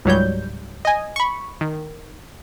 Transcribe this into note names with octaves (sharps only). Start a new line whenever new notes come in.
C#2 G#2 F#3 G3 C#5 G6
D#5 G#5
B5 C#6
D#3